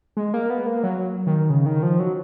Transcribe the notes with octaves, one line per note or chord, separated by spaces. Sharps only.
G#3
A#3
B3
A#3
F#3
D#3
C#3
D#3
F3
F#3